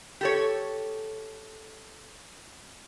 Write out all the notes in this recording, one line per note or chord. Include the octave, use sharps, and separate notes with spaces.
G4 A4 C#5